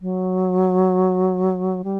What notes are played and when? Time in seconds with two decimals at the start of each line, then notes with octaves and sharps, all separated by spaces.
0.01 F#3
1.84 G3